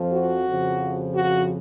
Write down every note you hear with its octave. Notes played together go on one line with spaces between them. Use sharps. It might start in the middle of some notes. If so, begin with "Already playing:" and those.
Already playing: F2 F3
F#4
F2 C#3 F3
F#4